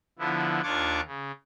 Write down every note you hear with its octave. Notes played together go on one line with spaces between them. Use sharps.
D3 F3 B3 E4
D#2 D4 F4 C#6 D6 G#6
C#3